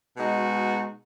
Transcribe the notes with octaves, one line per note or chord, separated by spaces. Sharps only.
B2 G#3 D#4 F#4